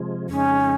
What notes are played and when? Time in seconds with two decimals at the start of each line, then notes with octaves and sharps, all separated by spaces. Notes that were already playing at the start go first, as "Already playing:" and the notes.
Already playing: C3 F3 G#3
0.30 F2 C#3 G#3 C#4 D#4